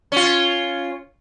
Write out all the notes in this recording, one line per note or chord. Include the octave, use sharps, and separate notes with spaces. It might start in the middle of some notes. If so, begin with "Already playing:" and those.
C#4 F4